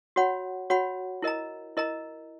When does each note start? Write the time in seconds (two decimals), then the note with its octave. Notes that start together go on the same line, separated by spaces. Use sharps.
0.16 F#4 C#5 F#5 B5
0.70 F#4 C#5 F#5 B5
1.22 E4 A#4 D#5 A#5
1.77 E4 A#4 D#5 A#5